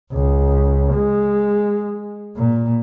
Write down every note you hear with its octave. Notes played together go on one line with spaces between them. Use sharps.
C#2
G#3
A#2